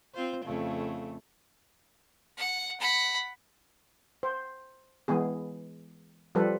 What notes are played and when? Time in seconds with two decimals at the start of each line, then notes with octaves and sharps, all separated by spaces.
0.14 C4 F4 C5
0.46 F2 C#3 A3
2.37 F#5
2.80 F#5 B5
4.23 C5
5.08 E3 G#3 B3 G#4
6.35 F3 G3 A4 B4